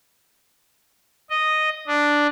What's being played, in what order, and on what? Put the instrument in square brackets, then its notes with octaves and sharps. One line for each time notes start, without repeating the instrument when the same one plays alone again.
[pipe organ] D#5
D4